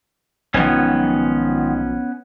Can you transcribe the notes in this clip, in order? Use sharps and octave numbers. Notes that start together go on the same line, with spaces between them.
B1 G#2 D#3 F3 B3 C#4